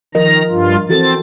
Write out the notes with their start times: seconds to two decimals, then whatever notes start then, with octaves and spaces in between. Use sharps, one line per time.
0.15 D#3 F3 A#4 D#5 A#5
0.50 G2 F4
0.89 E3 C4 F#4 A4 A6